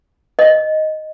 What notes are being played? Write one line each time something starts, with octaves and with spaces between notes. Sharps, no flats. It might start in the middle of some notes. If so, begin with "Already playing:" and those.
D#5